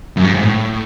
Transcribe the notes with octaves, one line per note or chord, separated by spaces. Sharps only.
F#2
G2
G#2
A2